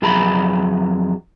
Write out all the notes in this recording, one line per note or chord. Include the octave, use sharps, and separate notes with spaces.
F2 F#3 G#4 E5 A#5 B5